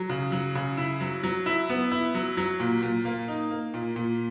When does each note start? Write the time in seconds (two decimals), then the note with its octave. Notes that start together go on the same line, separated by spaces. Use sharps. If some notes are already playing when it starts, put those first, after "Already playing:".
Already playing: F#3
0.10 C#3
0.32 F#3
0.55 C#3
0.77 E4
1.01 F#3
1.23 F#3
1.46 E4
1.70 B3
1.92 E4
2.15 F#3
2.37 F#3
2.60 A#2
2.83 A#2
3.05 A#3
3.28 D#4
3.51 A#3
3.74 A#2
3.96 A#2